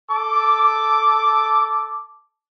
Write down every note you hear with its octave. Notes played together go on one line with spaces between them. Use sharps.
A4 D6